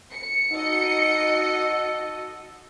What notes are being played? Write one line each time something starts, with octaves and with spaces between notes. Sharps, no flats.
C#7
D#4 F#4 A4 D#5